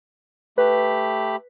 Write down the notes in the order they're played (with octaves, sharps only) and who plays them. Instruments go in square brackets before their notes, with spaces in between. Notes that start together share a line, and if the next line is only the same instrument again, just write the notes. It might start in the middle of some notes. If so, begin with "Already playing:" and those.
[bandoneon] A3 G4 B5 [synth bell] B4